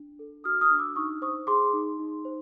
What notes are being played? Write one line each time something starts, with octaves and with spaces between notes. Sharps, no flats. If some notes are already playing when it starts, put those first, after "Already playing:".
Already playing: D4
A4
F#4 D#6 F6
D#6 F6
D4
D6 E6
D#4 C#6 D#6
C5 C#6 D#6
G#4 C6 D6
D#4
D#4
C5